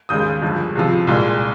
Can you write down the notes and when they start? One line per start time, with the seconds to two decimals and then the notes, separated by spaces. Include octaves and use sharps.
0.09 D#2 C#3 G#3 D#6 G6
0.42 G1 G2 F3 G#3
0.75 C#2 C3 F3
1.07 C2 A#2 G#3